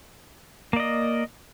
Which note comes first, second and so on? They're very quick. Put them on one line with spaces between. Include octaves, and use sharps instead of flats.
A#3 D5 D#5